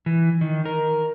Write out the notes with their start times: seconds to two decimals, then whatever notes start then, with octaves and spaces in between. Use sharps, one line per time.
0.06 E3
0.41 D#3
0.66 A#4